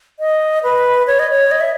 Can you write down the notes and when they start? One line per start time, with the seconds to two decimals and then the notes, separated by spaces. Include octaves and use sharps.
0.19 D#5
0.63 B4
1.07 C#5
1.19 D#5
1.31 C#5
1.51 D#5
1.61 E5